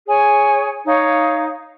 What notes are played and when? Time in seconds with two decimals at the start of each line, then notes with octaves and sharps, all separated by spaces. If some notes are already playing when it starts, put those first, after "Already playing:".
0.07 G#4 C#5 G#5
0.84 D#4 C#5 F5